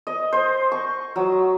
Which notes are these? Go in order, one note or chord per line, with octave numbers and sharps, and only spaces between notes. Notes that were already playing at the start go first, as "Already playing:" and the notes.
D#5
C5
C#6
F#3